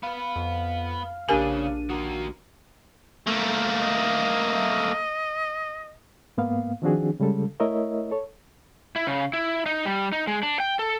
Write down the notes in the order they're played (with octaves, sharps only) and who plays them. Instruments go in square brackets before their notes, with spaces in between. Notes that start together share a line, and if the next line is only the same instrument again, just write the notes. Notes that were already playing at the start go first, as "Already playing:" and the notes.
[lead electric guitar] B3 B4 [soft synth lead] F5
[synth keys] F2
[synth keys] A#1 D4 D#7 [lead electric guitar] C#3 [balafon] G4 A#4 G#5
[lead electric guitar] D#3 A#3 [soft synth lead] F#4
[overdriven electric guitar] A3 A#3
[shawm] D#5
[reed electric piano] G#2 A#3 B3 F5
D#3 F3 C4 D4 F#4 G#4
C#3 G3 G#3 A4
A3 E4 A#4 C#5 D#5 E5
A4 C#5
[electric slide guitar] E4
C#3
E4
D#4
G3
D#4
G#3
D4
G5
A4